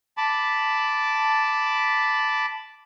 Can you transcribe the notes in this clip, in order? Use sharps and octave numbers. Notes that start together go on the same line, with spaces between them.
A5 B5 D6